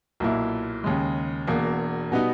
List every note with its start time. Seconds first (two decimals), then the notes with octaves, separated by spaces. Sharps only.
0.20 B1 A#2 A#3 E4
0.84 D#2 C#3 G#3
1.47 E1 E2 B2 A#3
2.12 B2 G3 B3 D#4